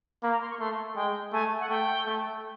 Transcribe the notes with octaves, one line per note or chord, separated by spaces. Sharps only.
A#3 B5
A#5
C6
C#6
A3 C6
G#3 G5
A3 G#5
F#5
A3 G5
A3